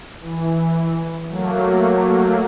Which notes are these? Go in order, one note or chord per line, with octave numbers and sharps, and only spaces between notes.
E3
F#3 A3 A#3